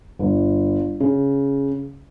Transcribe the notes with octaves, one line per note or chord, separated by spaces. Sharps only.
G1
C#3